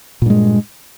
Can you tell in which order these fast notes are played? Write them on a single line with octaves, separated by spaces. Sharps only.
A#2 G2 G#3